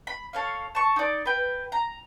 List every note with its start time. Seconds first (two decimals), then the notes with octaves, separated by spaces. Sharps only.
0.07 B5
0.33 A4 C#5 F5
0.75 A5 C#6
0.96 D#4 D5
1.26 B4 G5
1.72 A#5